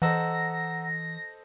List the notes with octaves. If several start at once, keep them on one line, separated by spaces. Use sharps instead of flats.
E3 A4 C5 D#5 F#5 A#5 E6 A#6